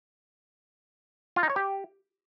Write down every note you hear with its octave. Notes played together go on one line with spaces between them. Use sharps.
F4
D#4
C#5
G4